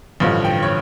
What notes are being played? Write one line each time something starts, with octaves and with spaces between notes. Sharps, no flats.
A1 G2 D3 F3
G5
C#5